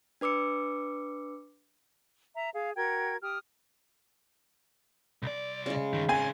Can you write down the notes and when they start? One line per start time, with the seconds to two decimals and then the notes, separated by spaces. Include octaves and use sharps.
0.21 D4 B4 D6 E6 C#7
2.35 E5 A#5
2.53 G#4 F5
2.76 F#4 A#4 G5 G#6
3.22 G4 D#6 F6
5.23 C2 D5
5.66 C#3 G#3
5.93 G2 D#3
6.09 C4 G#4 G#5